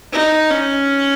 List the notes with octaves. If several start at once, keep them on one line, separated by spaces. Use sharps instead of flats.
D#4
C#4